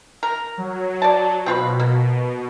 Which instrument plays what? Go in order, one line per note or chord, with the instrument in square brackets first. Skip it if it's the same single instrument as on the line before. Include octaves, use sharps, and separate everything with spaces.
[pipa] A#4
[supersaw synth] F#3
[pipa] D5 A5
[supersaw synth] B2 [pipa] C4 F4 B4
[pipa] A#3